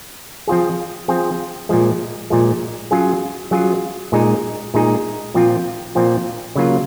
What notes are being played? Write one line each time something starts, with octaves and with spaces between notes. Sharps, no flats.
F3 C4 F4 G#4
F3 C4 F4 G#4
A#2 F3 G#3
A#2 F3 G#3
F#3 C#4 F4 G#4
F#3 C#4 F4 G#4
A#2 G#3 D#4 G#4
A#2 G#3 D#4 G#4
A#2 F3 C4 F4
A#2 F3 C4 F4
C#3 F#3 A#3 F4